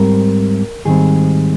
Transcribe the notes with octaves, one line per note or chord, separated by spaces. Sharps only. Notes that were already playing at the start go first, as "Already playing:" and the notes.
Already playing: G#2 G3 C4 A#4
G#2 D#3 G3 C4 G#4